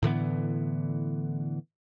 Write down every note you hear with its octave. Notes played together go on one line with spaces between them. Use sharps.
A2 D3 E3 B3